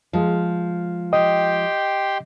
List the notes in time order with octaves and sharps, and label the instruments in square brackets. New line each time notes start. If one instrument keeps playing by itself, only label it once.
[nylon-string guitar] F3 G#3
[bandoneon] G4 G5 C6 [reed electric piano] D#5